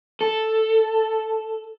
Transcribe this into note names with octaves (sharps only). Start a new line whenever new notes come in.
A4